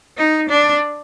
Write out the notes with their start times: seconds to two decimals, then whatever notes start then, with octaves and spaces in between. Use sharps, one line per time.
0.17 D#4
0.49 D4